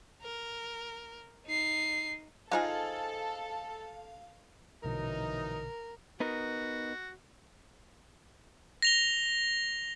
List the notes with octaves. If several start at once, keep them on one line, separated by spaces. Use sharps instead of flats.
A#4
D#4 C7
G#3 D#4 F4 G#4 A4 C5 F5 A5
A#1 B2 D3 E3 F#3 D#4 A#4
B3 D#4 F#4 A#4
A#6 F7 G7